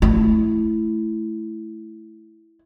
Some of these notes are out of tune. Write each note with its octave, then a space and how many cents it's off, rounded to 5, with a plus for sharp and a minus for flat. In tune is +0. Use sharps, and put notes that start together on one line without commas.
A3 -10 E4 +0